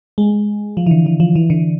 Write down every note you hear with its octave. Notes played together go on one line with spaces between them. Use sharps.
G#3
F3
E3
D3
E3
F3
E3
D3